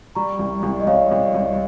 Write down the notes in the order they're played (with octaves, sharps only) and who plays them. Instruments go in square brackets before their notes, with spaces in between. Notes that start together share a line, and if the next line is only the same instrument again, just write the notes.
[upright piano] G3 [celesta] A#5 C#6
[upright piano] C2
C2
[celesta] D#5
[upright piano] C2 [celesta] C#5 F5
[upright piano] C2
C2